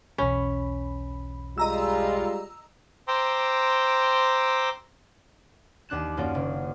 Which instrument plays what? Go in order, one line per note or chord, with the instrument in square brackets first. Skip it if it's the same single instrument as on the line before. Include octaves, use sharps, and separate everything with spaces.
[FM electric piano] B1 E2 B5 [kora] C#4
[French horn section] G3 G#3 F4 [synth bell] D#5 A#5 E6
[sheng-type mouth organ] C5 G5 A#5 C6 D6 E6
[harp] D#2 D4 F#6 E7
F#2 A#3 F4 D5
F#1